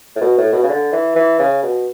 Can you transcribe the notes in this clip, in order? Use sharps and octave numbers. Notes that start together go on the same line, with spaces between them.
A2
B2
A2
B2
C#3
D3
E3
E3
C#3
B2